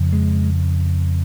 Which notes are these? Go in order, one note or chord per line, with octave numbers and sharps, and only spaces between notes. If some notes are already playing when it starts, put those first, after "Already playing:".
Already playing: F2 C#3
G#3